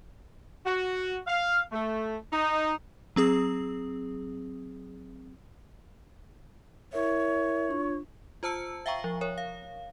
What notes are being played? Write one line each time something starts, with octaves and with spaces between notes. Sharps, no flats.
F#4
F5
A3
D#4
F#3 C4 G#4 D#6
E4 A#4 C#5 E5
D4 F4 C#6
F4 C5 A5 E6 C#7
E5 F5 G5 A#5 C#6
F3
A#4 C#5
F5